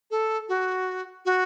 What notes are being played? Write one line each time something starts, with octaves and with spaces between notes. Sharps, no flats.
A4
F#4
F#4